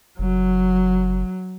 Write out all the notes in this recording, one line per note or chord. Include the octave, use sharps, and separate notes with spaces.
F#1 F#3